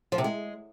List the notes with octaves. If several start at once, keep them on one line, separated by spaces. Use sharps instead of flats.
F3
C3
G#3